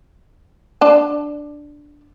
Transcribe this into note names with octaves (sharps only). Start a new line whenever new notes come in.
D4 A5